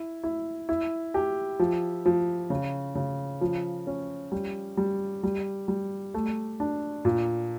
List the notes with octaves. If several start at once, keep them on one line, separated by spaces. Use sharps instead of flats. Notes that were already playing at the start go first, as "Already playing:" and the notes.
Already playing: E4
E4
E4
G4
F3
F3
C#3
C#3
F3
C#4
G3
G3
G3
G3
A3
D4
A#2